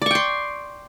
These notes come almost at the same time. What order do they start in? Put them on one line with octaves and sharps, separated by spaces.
D5 C#6 G5 C6